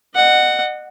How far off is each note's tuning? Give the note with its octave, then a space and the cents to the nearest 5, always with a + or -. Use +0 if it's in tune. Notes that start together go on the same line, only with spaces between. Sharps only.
D#5 -35 F#5 +5